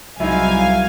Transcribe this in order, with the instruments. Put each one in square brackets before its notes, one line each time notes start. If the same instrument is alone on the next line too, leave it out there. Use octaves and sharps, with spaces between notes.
[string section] C2 F5 G#5 [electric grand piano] F#3 G#3 D#4 [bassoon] E4